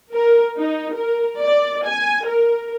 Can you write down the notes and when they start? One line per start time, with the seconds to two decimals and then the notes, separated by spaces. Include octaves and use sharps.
0.13 A#4
0.59 D#4
0.94 A#4
1.41 D5
1.86 G#5
2.26 A#4